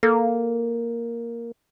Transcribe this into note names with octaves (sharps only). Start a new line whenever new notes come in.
A#3 A4